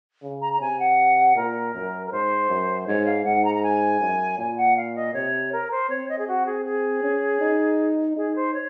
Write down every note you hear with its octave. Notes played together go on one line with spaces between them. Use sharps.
C#3
A#5
A#5
C3 G#5
F#5
A#2 A#4
F#2
A#4
G#2 C5
F#2
G#2 C#5
F5
G#2 F#5
A#5
A#5
G#5
F#2
A#2 G#5
F#5
F5
D#5
C3 C#5
A#4
C5
C4 C#5
D#5
G#4
F#4
G#4
G#4
C#4
D#4
D#4 G#4
C5
C#5